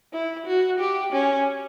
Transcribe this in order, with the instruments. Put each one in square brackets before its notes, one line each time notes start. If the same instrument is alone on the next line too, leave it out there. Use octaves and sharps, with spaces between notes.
[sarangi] E4
F#4
G4
C#4